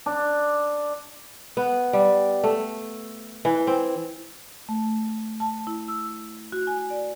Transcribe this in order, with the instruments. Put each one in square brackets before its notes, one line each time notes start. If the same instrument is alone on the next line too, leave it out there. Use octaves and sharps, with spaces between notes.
[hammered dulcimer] D4
[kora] B3
G3
A3
E3
C4
[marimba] A3
A5
E4
E6
F#4
G#5
D5